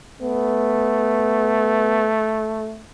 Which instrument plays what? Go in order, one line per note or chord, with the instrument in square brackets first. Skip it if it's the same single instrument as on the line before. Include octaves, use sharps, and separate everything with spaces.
[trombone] A3 [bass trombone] B3